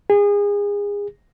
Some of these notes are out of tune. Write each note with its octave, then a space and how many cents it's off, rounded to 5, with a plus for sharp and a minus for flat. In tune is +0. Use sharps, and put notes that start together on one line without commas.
G#4 -30